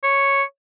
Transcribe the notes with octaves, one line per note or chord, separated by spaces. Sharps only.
C#5